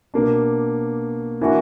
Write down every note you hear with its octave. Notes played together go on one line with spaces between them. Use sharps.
B2 A#3 D4
E3 A#3 D4 F#4